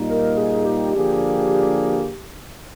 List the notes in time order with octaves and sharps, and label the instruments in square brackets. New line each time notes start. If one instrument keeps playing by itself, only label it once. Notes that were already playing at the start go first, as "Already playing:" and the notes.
Already playing: [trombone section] A#2 G3 A#3 D#4
[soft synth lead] A#4
G#4
G4
[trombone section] D3 F3 A#3 D4 G#4